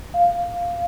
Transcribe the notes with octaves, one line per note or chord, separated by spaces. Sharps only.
F5